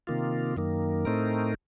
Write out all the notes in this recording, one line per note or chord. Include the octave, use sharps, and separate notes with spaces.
C3 D#3 A#3 F4
F#2 D#3 A#3
A2 A3 C4 D#4 A#4